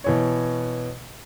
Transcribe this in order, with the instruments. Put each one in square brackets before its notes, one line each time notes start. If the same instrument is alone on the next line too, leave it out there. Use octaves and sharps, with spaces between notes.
[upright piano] B2 E3 C#5